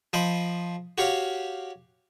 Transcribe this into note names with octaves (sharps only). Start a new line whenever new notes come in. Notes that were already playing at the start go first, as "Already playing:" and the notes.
F3 D#5 G5 B5
F#4 G4 C#5 F5